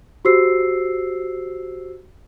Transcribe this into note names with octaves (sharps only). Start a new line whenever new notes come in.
F#4 G4 C5 E6 C7